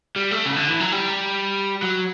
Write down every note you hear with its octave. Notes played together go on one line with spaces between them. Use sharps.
G3
A3
C#3
D3
E3
F#3
G3
F#3